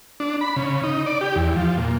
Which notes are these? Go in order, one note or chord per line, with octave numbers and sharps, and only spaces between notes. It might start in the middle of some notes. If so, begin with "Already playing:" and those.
D4
B5
C#3
D#4
D5
G4
E2
F3
A#2